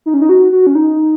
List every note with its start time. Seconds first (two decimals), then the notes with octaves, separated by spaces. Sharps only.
0.06 D#4
0.14 C#4
0.22 D#4
0.29 F#4
0.52 F#4
0.67 C#4
0.75 D#4